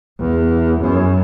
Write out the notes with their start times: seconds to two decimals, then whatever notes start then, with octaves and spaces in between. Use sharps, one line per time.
0.20 E2
0.81 F#2